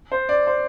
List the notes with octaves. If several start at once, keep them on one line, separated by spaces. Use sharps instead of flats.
C5
D5
C5